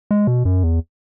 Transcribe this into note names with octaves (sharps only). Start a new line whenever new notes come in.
G#3
B2
F#2
E2